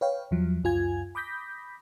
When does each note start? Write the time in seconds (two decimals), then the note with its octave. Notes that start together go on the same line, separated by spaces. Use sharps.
0.01 B4 C#5 F5 G5
0.31 E2 F3 F#3
0.64 C#2 F#2 F4 G#5 G#6
1.15 B5 D6 D#6 G6 A#6 B6